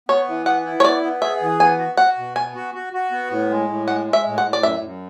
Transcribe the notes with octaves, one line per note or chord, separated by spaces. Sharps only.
B3 C#5
E3
B3 F#5
E4
C#5
B3 D5
B3
G#4 E5
E3
B3 G#5
F#4
F#4 F#5
B2
B3 G#5
F#4
F#4
F#4
B3
A2
G#3
A2
G#3 F#5
G#3
E5
A2
F#5
A2
D5
F#2 E5
F#2